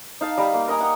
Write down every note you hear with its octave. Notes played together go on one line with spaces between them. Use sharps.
D#4 F5 A5
G3 A#5 B5
A#3
A#4 D#5 G#5 A#5
F#5 G5 D#6